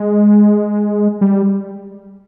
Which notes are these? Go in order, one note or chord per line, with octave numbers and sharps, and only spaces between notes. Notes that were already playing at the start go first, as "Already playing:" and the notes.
Already playing: G#3
G3